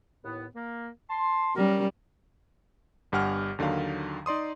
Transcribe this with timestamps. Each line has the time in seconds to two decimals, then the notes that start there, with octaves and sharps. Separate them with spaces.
0.24 D#2 A2 B3
0.55 A#3
1.10 A5 C6
1.56 G3 C#4 A#4
3.12 G1 G2 G4 F#5 G#5 F6
3.59 D#2 D3 D#3 F#3 F5
4.26 D#4 D5 C6 D#6